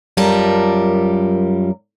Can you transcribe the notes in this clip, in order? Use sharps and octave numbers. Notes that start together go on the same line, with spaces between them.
F#2 G3 F4 A#4 A5